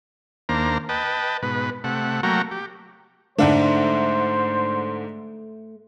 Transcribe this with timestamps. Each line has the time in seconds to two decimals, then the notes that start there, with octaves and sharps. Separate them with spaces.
0.49 D#2 A#3 D4 C5 A#5
0.89 B4 D#5 G5 A5
1.43 G#2 B2 B4
1.84 C3 A3 F#5
2.23 F#3 A3 A#3 F#4 G5 A#5
2.51 G4
3.39 G#2 D3 A3 D4 C5